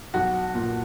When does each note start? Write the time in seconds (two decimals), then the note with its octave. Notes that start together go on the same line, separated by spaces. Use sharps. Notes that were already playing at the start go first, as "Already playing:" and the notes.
0.14 B1 F#4
0.54 A#2